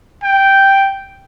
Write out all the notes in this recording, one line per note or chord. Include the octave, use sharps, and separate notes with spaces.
G5